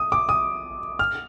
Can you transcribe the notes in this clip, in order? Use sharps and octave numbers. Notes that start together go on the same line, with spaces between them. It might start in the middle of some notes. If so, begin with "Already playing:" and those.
Already playing: D#6
D6
D#6
F6